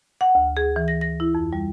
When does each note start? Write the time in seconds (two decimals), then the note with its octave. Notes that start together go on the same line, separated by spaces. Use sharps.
0.21 F#5
0.35 D2
0.57 G#4
0.76 E3
0.88 A#6
1.01 A#6
1.20 E4
1.35 F2
1.53 G3